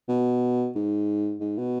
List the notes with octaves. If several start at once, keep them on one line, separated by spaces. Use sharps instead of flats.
B2
G#2
G#2
B2